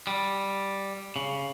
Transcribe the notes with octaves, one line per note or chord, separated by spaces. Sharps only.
G3
C#3